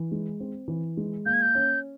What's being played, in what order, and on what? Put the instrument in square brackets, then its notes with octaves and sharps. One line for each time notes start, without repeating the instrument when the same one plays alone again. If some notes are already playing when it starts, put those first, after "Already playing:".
Already playing: [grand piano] E3
G#3
C4
E3
G#3
[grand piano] A#3 [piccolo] G6
[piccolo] G#6
G6
[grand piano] C#4